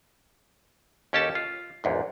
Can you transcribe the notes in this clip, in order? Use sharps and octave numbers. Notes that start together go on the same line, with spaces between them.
D#2 C#4 G4 A4 A5
F4
A#1 E2 G#2